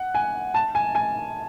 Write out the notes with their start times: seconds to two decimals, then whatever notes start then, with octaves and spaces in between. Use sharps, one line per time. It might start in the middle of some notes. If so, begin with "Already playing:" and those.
Already playing: F#5
0.14 G#5
0.54 A5
0.75 G#5
0.95 G#5